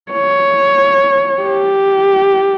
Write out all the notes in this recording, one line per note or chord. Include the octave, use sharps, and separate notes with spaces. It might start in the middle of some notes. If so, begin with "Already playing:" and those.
C#5
G4